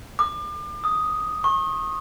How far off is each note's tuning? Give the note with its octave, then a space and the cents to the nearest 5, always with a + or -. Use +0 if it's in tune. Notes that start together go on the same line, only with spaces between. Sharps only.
D6 +35
D#6 +5
C#6 -35